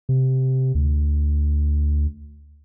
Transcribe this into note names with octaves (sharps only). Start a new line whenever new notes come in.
C3
D2